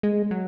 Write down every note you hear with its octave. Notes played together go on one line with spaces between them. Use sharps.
G#3
F#3